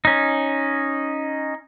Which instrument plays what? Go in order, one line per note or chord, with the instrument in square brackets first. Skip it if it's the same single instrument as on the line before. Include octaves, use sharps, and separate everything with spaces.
[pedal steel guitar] C#4 D#4